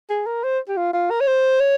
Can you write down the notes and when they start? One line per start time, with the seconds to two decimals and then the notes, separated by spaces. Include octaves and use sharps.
0.10 G#4
0.27 A#4
0.44 C5
0.68 G4
0.77 F4
0.93 F4
1.10 A#4
1.20 C#5
1.27 C5
1.60 C#5